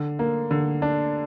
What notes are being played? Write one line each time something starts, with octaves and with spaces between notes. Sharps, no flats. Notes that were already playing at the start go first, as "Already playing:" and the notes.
Already playing: D3
A#3
D3
D4